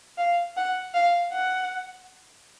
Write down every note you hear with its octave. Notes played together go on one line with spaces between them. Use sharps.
F5
F#5
F5
F#5